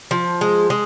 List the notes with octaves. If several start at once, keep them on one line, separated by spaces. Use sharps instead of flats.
F3
G#3
G#3